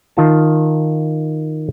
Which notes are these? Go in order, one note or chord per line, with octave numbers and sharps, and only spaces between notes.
D#3 F4 A5